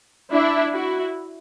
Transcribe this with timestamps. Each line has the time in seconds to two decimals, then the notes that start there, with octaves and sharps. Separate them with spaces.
0.33 D4 E4
0.73 E4 F#4